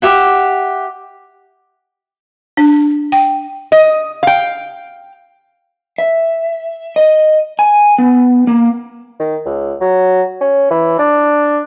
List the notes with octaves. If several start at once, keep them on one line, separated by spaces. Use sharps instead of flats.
G4 E5 F#5
D4
G5
D#5
F5 G5
E5
D#5
G#5
B3
A#3
D#3
C#2
F#3
C#4
E3
D4